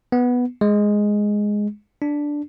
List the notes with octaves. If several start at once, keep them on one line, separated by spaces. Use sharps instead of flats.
B3
G#3
D4